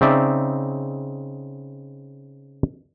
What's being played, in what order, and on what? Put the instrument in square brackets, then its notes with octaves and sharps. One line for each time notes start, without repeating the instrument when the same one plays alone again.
[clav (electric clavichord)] C#3 C4 D#4 D5 E5